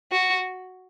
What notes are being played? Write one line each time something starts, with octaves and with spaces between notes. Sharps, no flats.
F#4